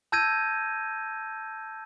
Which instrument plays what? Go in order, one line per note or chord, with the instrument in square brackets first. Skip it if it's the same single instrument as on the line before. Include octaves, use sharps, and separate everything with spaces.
[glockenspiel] A5 E6 G6 G#6 A#6 D#7